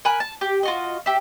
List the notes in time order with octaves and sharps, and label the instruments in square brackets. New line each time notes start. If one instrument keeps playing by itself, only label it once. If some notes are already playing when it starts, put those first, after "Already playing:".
[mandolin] A#4 G#5 B5 F#6
A5
G4
F4 F#4 D#5
G4 E5